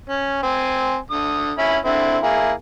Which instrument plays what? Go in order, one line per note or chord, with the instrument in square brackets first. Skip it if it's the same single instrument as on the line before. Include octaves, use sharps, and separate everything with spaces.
[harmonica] C#4
C4 G#5
D3 D#6
C#4 E4 B5
D3 C4 E4
A#3 E4 G#4